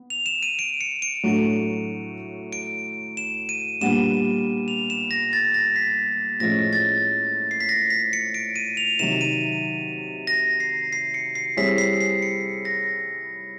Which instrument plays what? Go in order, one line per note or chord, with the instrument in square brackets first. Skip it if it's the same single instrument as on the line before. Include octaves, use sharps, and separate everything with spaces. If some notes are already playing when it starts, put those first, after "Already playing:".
Already playing: [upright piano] B3
[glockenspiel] F7
E7
D#7
D7
C#7
D7
[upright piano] A2 F#3 A3 D4 F#4
[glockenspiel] D7
E7
D#7
[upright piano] A#2 G3 B3 D4 [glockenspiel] E7
[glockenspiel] F7
E7
A#6
A6
A#6
B6
[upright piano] A2 F3 G#3 C#4 [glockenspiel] A#6
[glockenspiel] A6
C7
B6
A#6
B6
C#7
D7
D#7
F7
[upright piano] C3 D#3 F#3 [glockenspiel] E7
[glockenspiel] D#7
A#6
C7
C7
C#7
C7
[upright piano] G3 C4 E4 G#4 C#5 [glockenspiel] B6
[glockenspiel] C7
C7
C#7
A#6